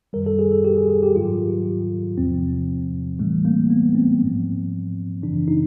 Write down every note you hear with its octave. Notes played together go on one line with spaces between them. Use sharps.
F#2 D#3 G3 A#4
A4
G#4
A4
G4
G#4
G#4
G4
G#2 D#3 F#3 F4
E2 C3 F3 C4
A2 E3 G3 A3
A#3
B3
C4
G#2 F3
F#2 C#3 E3 D4
D#4